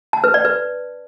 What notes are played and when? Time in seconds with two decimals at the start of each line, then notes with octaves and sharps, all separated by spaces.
0.13 A5
0.24 B4
0.34 D5
0.45 B4